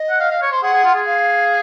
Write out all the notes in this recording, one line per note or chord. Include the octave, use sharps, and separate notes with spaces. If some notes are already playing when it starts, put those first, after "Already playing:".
Already playing: D#5
F#5
F5
F5
C#5
C5
G#4 F#5
G#4
F4
G#4
F5